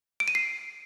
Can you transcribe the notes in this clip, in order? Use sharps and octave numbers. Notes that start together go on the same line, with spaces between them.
D7
D#7
C7